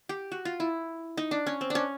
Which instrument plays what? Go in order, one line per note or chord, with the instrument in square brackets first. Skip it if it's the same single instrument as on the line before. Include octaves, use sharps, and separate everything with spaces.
[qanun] G4
F#4
F4
E4
D#4
D4
C#4
C4
C#4 D4